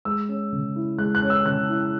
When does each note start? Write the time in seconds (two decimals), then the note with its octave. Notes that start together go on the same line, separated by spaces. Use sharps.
0.05 G#3 E6
0.29 C#4
0.52 C#3
0.76 E4
0.98 G#3 F#6
1.15 F#6
1.22 C#4
1.30 E6
1.46 C#3 F#6
1.70 E4